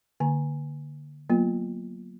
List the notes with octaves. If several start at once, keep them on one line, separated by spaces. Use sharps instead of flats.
D3 A#3 G#5 A#5
F#3 A#3 B3 F4